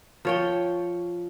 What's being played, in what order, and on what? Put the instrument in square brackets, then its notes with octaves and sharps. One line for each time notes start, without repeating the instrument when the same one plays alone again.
[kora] F3 C#5 G5